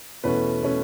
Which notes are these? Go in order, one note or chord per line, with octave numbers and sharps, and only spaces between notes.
E2 B2 A3 C#4 B4
B2 A3 C#4